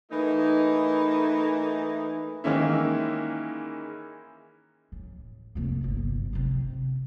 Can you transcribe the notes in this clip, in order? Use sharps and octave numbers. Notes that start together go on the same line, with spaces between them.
E3 A3 A#3 D#4
D#3 E3 G#3 A#3 C#4 E4
A1
F1 A#3
G1 F#2
C3 D#3